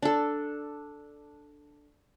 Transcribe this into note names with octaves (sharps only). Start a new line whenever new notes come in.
D4 A4